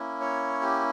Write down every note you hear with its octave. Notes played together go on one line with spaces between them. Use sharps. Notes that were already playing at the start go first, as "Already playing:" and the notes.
Already playing: A#3 C#4 E4
C#5
G4